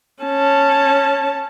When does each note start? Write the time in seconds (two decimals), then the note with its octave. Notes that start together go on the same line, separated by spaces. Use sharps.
0.23 C#4 A5